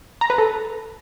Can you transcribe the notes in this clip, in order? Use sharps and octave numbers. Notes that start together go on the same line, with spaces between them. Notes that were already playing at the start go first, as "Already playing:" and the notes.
A#5
B4
A4